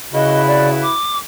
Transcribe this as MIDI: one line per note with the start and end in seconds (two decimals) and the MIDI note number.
0.13 0.86 49
0.13 0.93 64
0.13 0.93 66
0.13 0.93 71
0.13 0.41 75
0.47 0.69 74
0.83 1.17 86